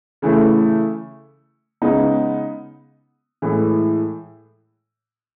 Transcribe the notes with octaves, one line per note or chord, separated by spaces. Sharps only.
C#3 E3 A3
C#3 G#3 B3 D#4
A2 E3 G#3